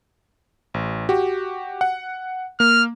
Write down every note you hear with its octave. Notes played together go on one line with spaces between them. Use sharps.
A1
F#4 G4
F#5
A#3 F6